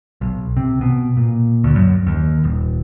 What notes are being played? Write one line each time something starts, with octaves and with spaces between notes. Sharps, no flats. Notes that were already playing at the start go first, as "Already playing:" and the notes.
B1
C3
B2
A#2
D2
F#2
D#2
D#1